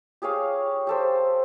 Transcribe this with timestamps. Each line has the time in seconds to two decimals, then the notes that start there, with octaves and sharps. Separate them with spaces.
0.22 G4 G#4 C#5 F5
0.87 G4 A4 C5